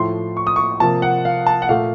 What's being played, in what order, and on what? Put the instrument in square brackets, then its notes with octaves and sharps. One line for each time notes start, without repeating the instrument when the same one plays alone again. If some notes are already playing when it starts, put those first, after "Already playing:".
Already playing: [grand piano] A2 F3 A3 C6
C#6
D#6
C#6
C3 F3 A#3 A5
F#5
F5
A5
F#5
A#2 A3 F5